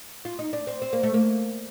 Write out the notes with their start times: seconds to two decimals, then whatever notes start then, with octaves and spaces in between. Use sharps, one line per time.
0.25 F4
0.39 D#4
0.53 D4
0.67 C4
0.82 C4
0.93 A#3
1.03 A3
1.14 A#3